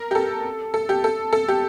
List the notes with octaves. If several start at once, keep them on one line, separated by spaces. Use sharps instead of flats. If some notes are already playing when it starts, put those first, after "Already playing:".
Already playing: A#4
G4
A4
A4
G4
A4
A4
G4